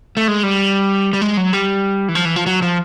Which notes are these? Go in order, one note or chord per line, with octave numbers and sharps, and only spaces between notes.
A3
G#3
G3
G3
G#3
F#3
G3
E3
F3
E3
F3
F#3
F3